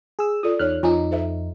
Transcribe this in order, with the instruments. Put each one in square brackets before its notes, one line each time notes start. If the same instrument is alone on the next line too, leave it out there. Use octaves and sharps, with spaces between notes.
[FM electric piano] G#4 E6
[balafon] F4 A4 D5 [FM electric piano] D#6
[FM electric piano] E2 F6 F#6 [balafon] D#4 C#5
[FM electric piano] F2 F3 D#4 [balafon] F4 G#5 A#5
[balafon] A4 C5 E5